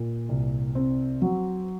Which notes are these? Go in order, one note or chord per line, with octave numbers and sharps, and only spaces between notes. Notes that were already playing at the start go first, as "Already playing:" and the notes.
Already playing: A#2
C2
C4
F#3